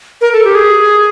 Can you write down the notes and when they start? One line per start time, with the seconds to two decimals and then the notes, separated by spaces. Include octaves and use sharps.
0.21 A#4
0.33 A4
0.44 G4
0.55 G#4